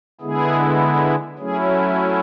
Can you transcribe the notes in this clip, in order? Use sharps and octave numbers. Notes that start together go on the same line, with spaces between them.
D3 G#3 B3 E4 G#4
F#3 A3 C#4 E4 G#4